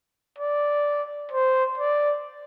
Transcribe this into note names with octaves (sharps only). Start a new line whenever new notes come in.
D5
C5
D5